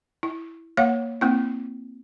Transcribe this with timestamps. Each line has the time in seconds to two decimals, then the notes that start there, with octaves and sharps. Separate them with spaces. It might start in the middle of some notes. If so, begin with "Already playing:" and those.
0.23 E4
0.77 A#3 C#5 F5 F#5
1.21 A#3 C4 E4